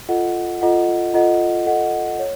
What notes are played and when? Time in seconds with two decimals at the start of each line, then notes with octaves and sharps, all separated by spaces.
0.09 F4 A4 D#5 F#5
0.61 F4 A4 D#5 F#5
1.14 F4 A4 D#5 F#5
1.66 F4 A4 D#5 F#5
2.19 C#5